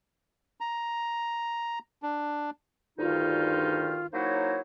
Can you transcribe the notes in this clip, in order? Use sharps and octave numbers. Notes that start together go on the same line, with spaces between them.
A#5
D4
D2 G2 D#3 D#4 F4
F#3 A#3 D#4 E4 C5 C#5